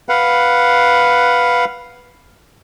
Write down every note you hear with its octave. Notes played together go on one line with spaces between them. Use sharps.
B4 F5 F#5